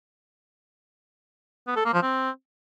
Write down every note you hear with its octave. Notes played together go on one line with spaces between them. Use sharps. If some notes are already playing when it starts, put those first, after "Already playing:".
B3
A4
A#3
F3
C4